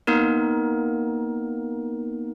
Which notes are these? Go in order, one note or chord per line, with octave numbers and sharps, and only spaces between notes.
A#3 B3 D#4 A#4